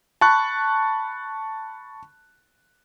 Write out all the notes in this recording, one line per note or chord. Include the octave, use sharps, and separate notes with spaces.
A5 B5 C#6 F#6